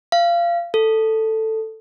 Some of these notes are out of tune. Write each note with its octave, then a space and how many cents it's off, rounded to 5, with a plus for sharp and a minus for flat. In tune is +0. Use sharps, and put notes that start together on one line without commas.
F5 -25
A4 +5